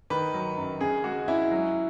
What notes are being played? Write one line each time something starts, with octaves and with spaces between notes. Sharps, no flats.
D#3 B4
F#3
F#2
C#3 G#4
G#3 F#4
C#4 E4
F#3